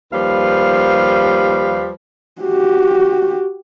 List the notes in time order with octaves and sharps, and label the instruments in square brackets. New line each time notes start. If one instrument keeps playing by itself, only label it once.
[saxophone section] D#2 F3 G3 B4 F5
[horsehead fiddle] F#4 G4